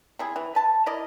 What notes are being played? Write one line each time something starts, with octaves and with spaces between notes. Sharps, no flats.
C3 E4 G#4
E3
B4 A5
E4 A#4 D5 D#5